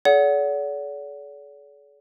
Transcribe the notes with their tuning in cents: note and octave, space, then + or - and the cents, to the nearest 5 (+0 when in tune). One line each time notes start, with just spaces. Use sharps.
G#4 +45 D5 -45 F#5 +0